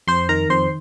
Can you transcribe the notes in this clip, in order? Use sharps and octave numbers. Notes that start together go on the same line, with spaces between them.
F2 C5 C6
D#3 A#4 A#5
F2 C5 C6